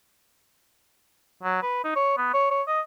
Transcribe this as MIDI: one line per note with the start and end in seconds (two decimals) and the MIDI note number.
1.43 1.58 54
1.62 1.84 71
1.84 1.93 63
1.96 2.15 73
2.17 2.30 59
2.34 2.50 73
2.51 2.63 73
2.68 2.81 75